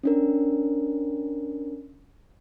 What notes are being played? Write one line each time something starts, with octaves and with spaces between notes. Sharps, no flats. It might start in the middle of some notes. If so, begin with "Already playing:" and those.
C#4 D4 A#4